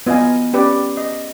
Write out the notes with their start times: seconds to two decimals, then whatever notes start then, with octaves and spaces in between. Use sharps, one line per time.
0.06 B3 F4 D#5 F5 G#5
0.53 C#4 G4 B4 D5
0.97 D#5